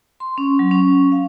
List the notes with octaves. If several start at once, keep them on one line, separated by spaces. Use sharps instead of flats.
C6
C#4
F#3
C#4
F5